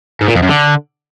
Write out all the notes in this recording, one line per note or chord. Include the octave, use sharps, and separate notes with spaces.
G#2
A#2
F2
F#2
D3